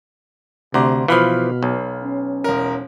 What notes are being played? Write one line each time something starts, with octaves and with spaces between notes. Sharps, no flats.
D2 C3 A#5 C6 D6
B2 E3 F3 F5 B5 F6
B1
C#4
E1 A#4